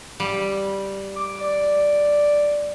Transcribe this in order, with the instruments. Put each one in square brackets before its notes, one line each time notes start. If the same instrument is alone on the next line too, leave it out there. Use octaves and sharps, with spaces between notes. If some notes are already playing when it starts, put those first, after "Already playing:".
[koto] G3
[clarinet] D6
D5